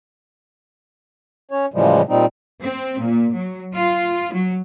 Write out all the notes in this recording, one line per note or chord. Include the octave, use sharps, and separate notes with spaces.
C#4 C#5
A2 C#3 E3 F3 G3 G#3
A#2 G3 C4 D#4
C4
A#2
F#3
F4
F#3